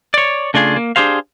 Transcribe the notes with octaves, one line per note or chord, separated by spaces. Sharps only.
C#5 D5
C#3 A3 D4 F4 G#4
A#3
D4 G4 G#4 C5 F5